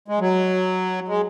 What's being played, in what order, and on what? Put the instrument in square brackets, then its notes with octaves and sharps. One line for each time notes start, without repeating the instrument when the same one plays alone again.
[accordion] G#3
F#3
G#3